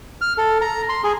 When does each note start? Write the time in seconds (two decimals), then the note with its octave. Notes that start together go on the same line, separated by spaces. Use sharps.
0.21 F6
0.38 A4
0.61 A#5
0.89 C6
1.04 G#4